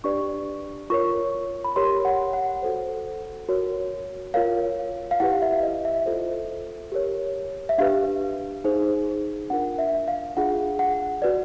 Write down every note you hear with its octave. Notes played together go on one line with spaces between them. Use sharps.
D4 G4 B4 D5 C#6
F4 A#4 C#5 C#6
B5
G4 A#4 C#5 C6
F#5
F#5
F#4 A4 C5
F#4 A#4 C#5
F4 A#4 C#5 F5
F5
E4 G4 B4 F#5
E5
D#5
E5
F4 A4 C5
G4 A#4 C#5
E5
D4 G4 B4 F5
D#4 G#4 C5
D4 F4 A#4 F#5
E5
F5
D4 F4 G#4 F#5
F#5
F#4 B4 D5